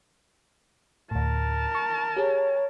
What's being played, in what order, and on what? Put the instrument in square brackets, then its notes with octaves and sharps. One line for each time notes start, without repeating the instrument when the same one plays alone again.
[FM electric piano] D2 A2 [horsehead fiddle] A#4 A5
[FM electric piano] C#6
[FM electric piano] G4 G#4 [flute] C#5